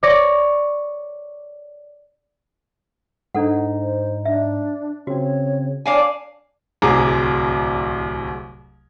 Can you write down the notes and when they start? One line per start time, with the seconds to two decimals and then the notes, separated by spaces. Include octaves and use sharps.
0.03 C#5 D5 C#6 D6 A#6
3.35 G#2 D4 D#4 A4 F#5
3.82 C5
4.25 D4 E5
5.07 C#3 C4 F#4 C#5
5.86 D4 C#5 F5 G#5
6.82 D1 C2 G#4 A#5 D6